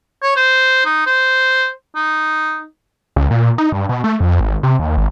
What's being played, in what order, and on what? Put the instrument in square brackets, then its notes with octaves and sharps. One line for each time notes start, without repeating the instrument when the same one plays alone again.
[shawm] C#5
C5
D#4
C5
D#4
[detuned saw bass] C#2
A#2
D#4
G2
B2
A3
F2
G#1
C3
D#2
G#1